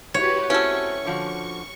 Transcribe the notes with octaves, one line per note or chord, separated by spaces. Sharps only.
G#2 E4 F#4 G4 B4 C#5
A3 C4 C#4 E4 F#4 C#6
D3 F3 F#4